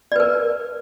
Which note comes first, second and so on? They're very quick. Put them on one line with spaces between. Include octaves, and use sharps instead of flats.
D5 B4 A#4